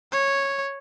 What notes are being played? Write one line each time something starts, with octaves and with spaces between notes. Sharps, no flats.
C#5